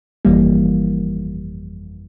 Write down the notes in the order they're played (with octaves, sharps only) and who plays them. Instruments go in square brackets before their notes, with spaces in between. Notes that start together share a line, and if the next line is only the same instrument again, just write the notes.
[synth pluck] G1 F2 E3 G3 A#3